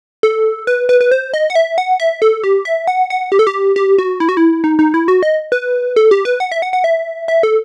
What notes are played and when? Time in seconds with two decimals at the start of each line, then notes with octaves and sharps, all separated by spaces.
0.23 A4
0.67 B4
0.89 B4
1.01 B4
1.11 C5
1.34 D#5
1.50 F#5
1.55 E5
1.78 F#5
2.00 E5
2.22 A4
2.44 G4
2.65 E5
2.88 F#5
3.10 F#5
3.32 G4
3.39 A4
3.47 G4
3.76 G4
3.98 F#4
4.20 E4
4.29 F#4
4.37 E4
4.64 D#4
4.79 D#4
4.94 E4
5.08 F#4
5.23 D#5
5.52 B4
5.96 A4
6.11 G4
6.25 B4
6.40 F#5
6.52 E5
6.62 F#5
6.73 F#5
6.84 E5
7.28 E5
7.43 A4